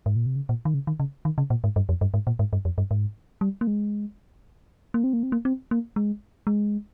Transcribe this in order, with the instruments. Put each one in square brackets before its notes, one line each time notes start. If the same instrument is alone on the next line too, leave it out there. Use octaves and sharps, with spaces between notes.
[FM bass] G#2
A#2
C3
C#3
A#2
D#3
C#3
D#3
C#3
D#3
C#3
A#2
G#2
G2
F2
G2
G#2
A#2
G#2
G2
F2
G2
G#2
G3
A#3
G#3
A#3
C4
A#3
C4
A#3
C4
A#3
G#3
G#3